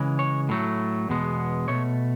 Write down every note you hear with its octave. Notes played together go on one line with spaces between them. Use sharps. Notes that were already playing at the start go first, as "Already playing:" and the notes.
Already playing: C#3 E3 G#3
C#5
A2 F#3 A3
E2 B2 G#3 B3
B2 A3 C#5